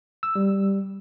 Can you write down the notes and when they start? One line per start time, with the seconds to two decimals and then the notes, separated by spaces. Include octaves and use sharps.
0.23 E6
0.35 G3